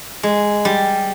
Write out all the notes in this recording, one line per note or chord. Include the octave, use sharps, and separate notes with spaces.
G#3
G3